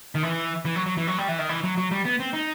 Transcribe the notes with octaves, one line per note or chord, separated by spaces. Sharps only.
D#3
E3
E3
F#3
F#3
E3
F#3
G3
E3
D#3
E3
F#3
F#3
G3
B3
C4
D#4